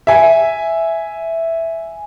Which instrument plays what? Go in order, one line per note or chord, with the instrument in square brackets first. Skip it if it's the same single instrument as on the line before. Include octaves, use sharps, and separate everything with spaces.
[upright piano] E5 G#5